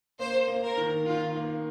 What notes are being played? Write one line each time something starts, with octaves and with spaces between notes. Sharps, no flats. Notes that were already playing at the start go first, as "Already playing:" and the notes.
A#3 C5
A#3
A#4
D#3
D#3 F4
A#3